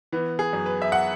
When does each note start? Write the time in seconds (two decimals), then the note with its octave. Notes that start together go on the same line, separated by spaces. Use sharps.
0.12 E3 B3
0.39 G#4
0.53 F#2
0.66 B4
0.82 E5
0.92 F#5